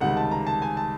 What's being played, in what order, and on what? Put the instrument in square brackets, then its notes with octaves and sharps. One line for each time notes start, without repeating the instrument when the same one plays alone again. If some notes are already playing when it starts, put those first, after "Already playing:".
[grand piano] C#2 C3 D#3 G3 F#5
A5
A#5
A5
G#5
A5